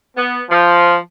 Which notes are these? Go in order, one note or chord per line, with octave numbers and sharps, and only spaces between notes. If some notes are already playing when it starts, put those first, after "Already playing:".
B3
F3